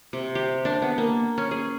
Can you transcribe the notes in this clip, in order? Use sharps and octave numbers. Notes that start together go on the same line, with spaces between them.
C3
G4
D4
B3
A#3
C#4
G#4